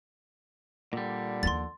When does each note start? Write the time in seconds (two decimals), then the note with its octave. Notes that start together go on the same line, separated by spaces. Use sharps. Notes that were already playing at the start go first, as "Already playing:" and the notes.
0.93 A#2 D3 G3
1.43 D#2 F3 C6 A6